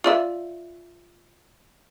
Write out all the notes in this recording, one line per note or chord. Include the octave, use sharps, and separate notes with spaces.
F4 D5 E5